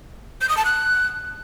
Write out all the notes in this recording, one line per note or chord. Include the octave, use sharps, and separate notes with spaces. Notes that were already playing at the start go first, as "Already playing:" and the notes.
G6
D#6
A5
F#6